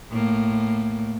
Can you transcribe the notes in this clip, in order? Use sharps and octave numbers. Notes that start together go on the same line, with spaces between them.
A2 A#3